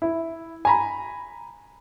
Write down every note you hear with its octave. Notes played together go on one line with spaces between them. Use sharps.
E4
G#5 A#5 B5